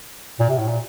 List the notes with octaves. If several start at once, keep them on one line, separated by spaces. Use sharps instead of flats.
A#2
C3
A2
A#2